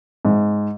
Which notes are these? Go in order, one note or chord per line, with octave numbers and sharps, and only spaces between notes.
G#2